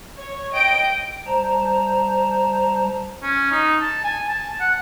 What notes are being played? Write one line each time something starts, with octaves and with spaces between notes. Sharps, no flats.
C#5
D#5 G5 D7
G3 C5 A5 A#5
C#4
D#4
A5
G#5
A5
F#5